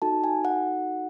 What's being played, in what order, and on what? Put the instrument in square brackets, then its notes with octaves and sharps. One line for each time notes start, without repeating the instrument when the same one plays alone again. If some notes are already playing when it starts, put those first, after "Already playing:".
[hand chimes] D#4 F#4 A4 A5
G#5
F#5